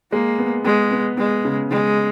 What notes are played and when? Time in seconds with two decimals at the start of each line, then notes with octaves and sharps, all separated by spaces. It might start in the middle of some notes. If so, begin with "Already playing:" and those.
0.12 G#3 A#3
0.38 B3
0.64 G#3 B3
0.91 B3
1.17 G#3 B3
1.45 C#3
1.70 C#3 G#3